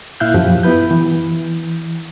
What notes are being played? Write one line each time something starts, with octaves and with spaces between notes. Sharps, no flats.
A#2 E4 E5 F5 F#6 G6
F#2 F3 G4
B3 E4 B4 G6
E3